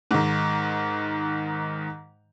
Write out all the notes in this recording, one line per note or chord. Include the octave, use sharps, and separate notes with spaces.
G#2 D#3